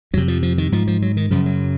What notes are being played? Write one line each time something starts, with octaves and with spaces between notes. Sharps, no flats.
F2 C3 F#3
F3
F3
D#3
G#2 F3
F3
F#3
D#3
F#2 C#3 F3
F#3